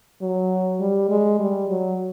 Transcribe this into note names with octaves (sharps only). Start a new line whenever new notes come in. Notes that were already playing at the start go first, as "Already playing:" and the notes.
F#3
G3
G#3
G3
F#3